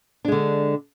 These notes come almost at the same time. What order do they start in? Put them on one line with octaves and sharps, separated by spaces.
D4 G#3 D3